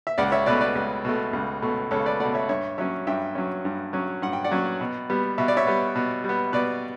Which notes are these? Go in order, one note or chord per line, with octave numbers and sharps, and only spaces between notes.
E5
C#2 D5 F#5
C#5 E5
B2 A3 B4 D5
B4 D5
C#2
B2 A3
C#2
B2 A3
C#2 A4 C#5
B4 D5
B2 A3 D5 F#5
C#5 E5
G2 C#5 E5
F#3 C#4 C#5 E5
G2 E5 G5
F#3 C#4
G2
F#3 C#4
G2 F#5
G5
D5 F#5
F#3 C#4
B2
G3 B3
B2 E5
D5
C#5 E5
G3 B3
B2
G3
B3
B2 B4 D5